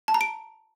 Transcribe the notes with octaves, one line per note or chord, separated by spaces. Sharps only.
A5
A#5
D7